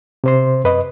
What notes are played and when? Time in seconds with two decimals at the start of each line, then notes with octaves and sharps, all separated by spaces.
0.24 C3 C5 C6
0.64 F#2 B4 D#5